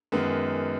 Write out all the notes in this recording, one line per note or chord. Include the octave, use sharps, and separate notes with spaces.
F#2 D#3 G#3 B3